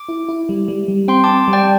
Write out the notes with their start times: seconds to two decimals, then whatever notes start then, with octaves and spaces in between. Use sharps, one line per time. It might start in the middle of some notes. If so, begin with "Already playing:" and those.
Already playing: D6
0.09 E4
0.29 E4
0.49 G3
0.68 G3
0.88 G3
1.08 C4 G5 C6
1.24 A5 D6
1.28 C4
1.48 G3
1.53 D5 G5